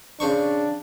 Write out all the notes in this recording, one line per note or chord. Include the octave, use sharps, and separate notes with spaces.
C#3 D4 C5 C#6